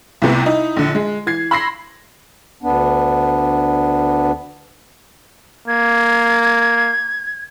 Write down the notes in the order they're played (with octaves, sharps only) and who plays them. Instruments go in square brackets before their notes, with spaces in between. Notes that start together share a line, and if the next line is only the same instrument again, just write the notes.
[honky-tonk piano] C2 A2 C3 B3
D#4 E4
A#1 D3
G#3
E3 G#6 C7
B5 C6 E6 A#6 C7
[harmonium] D2 B3 D4
[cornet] A#3 [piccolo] G#6